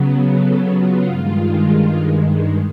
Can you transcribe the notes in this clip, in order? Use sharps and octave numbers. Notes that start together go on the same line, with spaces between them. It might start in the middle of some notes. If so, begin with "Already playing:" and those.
Already playing: C#3 F#3 B3
A4
F4
G2 D#3 G#3